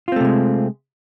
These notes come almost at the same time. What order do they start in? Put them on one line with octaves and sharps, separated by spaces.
F4 C4 A3 C3 G#3